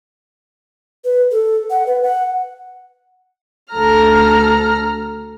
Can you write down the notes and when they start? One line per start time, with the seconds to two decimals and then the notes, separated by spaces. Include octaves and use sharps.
1.05 B4
1.32 A4
1.70 F#5
1.86 B4
2.03 F#5
3.72 D2 A4 A#5 F6